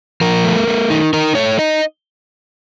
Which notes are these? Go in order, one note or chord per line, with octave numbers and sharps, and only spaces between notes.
F3 A#4
A3
A3
D#4
D#4 A#4
A3 C#5
D#4 D#5